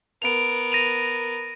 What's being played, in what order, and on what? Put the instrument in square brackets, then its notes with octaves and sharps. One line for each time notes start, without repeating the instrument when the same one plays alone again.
[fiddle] B3 A#4 [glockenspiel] D7 F7
[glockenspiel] A#6 D#7 F7